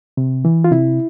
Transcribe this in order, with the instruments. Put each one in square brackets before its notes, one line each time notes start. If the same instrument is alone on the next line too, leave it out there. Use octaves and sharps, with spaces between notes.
[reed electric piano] C3
E3
F4
C3 E4